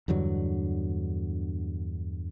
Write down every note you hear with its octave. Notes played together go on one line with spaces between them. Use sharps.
E2 G2 D3 F#3